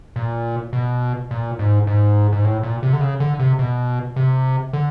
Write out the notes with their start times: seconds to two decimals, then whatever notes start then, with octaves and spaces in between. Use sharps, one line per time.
0.16 A#2
0.73 B2
1.31 A#2
1.59 G#2
1.87 G#2
2.32 G#2
2.45 A2
2.63 A#2
2.83 C3
2.93 D3
3.01 C#3
3.20 D3
3.39 C3
3.59 B2
4.16 C3
4.73 D3